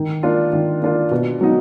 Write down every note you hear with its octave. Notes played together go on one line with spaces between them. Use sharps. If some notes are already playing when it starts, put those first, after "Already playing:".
Already playing: D#3
A#3 D4 F4
D#3
A#3 D4 F4
B2
F#3 B3 D#4 F#4